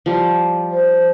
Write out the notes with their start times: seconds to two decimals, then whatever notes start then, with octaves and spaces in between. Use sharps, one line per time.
0.06 F3 G3
0.71 C5